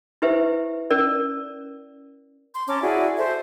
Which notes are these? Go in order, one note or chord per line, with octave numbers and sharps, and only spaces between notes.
E4 G4 B4 C5 E5
C#4 A#4 D5
C6
C#4 A5 A#5 D6
E4 F#4 G#4 D5
A4 C5 E5